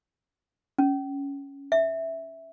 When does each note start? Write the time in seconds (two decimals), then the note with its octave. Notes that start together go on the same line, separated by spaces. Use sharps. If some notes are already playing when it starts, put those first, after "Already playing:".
0.78 C#4
1.72 E5